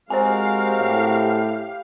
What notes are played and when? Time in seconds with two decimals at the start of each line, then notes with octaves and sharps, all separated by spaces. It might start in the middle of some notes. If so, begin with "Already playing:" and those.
0.10 G#3 C4 F#4 G4 A#4 C5 F5 G#5
0.80 A2